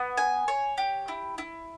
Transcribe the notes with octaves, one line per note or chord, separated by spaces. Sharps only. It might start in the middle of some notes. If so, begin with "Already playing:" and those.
Already playing: B3
G#5
C#5
G4
E4
E4